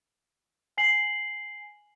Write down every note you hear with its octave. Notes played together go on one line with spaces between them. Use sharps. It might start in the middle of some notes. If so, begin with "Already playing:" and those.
G#5 C7 F#7